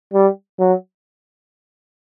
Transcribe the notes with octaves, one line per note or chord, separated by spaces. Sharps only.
G3
F#3